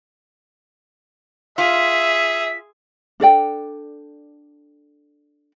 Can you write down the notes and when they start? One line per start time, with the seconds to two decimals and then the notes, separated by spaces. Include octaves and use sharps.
1.58 F4 G#4 E5 B6
3.20 D4 A4 D5 G5